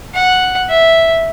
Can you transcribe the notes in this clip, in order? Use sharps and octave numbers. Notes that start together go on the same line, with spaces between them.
F#5
E5